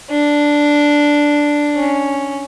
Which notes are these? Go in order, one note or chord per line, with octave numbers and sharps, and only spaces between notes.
D4
C#4